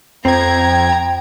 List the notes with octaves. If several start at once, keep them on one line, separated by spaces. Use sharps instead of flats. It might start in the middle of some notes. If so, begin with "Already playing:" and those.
F2 C4 G5 A#5 G#6